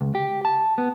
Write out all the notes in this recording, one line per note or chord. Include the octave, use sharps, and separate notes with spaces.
C#2
G4
A5
B3